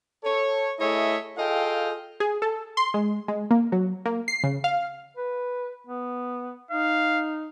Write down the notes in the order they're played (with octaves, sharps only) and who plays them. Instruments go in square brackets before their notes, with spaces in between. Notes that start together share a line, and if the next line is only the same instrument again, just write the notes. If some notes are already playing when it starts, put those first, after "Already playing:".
[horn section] A4 C#5
A3 E4 G#4 C#5 D#5 E5
F4 G#4 A4 D#5 F5 G5
[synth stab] G#4
A4
C6
G#3
G#3
A#3
F#3
A#3
C7
C#3
F5
[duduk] B4
B3
[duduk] D#4 [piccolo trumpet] F5